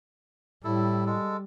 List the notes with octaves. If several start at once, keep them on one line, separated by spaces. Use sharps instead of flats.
A2 G3 E4 A4
G#3 A4